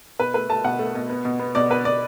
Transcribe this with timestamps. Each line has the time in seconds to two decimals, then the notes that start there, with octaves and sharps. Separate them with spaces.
0.19 B2 B4
0.34 A3 B4
0.50 A3 A5
0.64 B2 F#5
0.79 A3
0.95 B2
1.10 B3
1.25 B2
1.39 B3
1.55 B2 D5
1.70 B3 B4
1.85 B2 D5